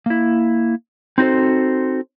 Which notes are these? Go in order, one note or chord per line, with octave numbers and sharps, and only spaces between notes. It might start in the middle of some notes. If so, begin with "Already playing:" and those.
A#3 E4
C4 D#4 F#4 A4 C5